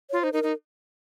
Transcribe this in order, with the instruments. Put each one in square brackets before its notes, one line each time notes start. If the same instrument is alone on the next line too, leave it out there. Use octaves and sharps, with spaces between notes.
[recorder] F4 [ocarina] C#5
[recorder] D#4 [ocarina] C5
[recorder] D#4 [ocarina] A#4
[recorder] D#4